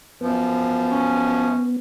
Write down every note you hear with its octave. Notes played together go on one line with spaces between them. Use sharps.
F#2 F3 B3
C#4